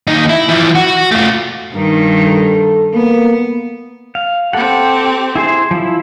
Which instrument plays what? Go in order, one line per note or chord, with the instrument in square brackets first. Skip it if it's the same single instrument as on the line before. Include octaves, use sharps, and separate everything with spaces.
[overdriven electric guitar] D#2 D#4
E4
E3 F3
F#4
A3 F4
[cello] G2 D#3
[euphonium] A4
[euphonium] A#3 [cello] B3
[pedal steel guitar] F5
[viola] C4 G4 [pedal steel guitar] A4 F#5
[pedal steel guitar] E4 G#4 C5
F3 E4